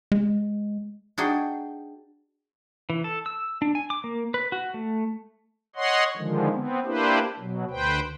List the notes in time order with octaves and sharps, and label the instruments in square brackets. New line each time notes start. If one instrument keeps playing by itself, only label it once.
[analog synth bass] G#3
[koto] D4 D#4 F#4 G#4 G5
[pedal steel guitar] E3
A4
E6
D4
G#5
D6
A#3
B4
F#4
A3
[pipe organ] C#5 D#5 F#5 C6
D3 D#3 F3 G#3
B3 C4
A#3 D4 E4 G4 B4 C5
B2 F#3
D2 B4 C5 G5